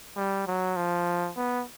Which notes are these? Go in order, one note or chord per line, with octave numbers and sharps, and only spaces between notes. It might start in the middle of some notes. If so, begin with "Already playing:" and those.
G3
F#3
F3
B3